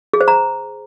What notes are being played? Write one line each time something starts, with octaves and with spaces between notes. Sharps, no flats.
G#4
C5
A#5